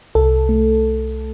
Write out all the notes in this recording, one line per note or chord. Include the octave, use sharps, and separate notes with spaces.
C2 A4
A3